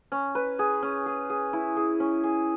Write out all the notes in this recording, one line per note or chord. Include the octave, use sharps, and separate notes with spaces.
C#4
B4
G#4
C#4
G#4
G#4
E4
G#4
C#4
G#4